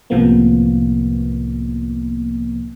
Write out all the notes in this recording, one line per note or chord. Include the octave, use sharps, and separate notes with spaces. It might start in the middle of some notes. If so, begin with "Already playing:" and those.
C2 A2 C3 F3 A#3 B3